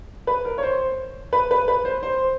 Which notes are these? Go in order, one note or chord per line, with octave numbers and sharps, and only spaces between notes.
B4
A#4
C#5
C5
B4
B4
B4
C5
C5